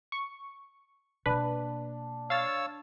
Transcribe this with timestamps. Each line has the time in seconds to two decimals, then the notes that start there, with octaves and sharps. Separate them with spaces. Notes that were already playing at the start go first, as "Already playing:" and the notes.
0.12 C#6
1.26 B2 A#3 D4 B4
2.30 C#5 F5 E6 A6